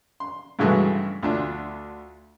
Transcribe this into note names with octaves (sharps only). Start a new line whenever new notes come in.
C6
G2 C#3 E3 F#3 G#3 A3
D2 D4 F4